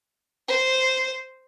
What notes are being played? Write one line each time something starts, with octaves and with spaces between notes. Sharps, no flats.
C5